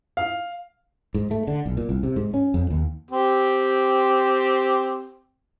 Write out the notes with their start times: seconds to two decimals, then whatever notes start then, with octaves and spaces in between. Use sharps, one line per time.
0.17 F5
1.14 G#2
1.31 A3
1.47 D3
1.66 B1
1.77 A#2
1.89 C2
2.03 C3
2.16 G#2
2.34 C#4
2.54 F2
2.70 D#2
3.11 C4 G4